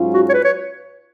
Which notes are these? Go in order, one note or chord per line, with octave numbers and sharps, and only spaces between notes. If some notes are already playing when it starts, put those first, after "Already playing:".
Already playing: G#2 F#3 C#4 F4
F#4
C#5
B4
C#5